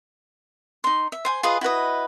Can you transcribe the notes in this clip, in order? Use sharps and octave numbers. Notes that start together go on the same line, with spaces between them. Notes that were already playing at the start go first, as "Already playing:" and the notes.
D#4 C6
E5
C5 G#5 C6
F4 G#4 B4 D#5
E4 F#4 B4 D#5